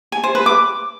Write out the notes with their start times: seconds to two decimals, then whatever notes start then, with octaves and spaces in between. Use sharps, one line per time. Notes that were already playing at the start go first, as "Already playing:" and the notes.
0.12 G#5
0.24 C5
0.35 B4
0.46 D6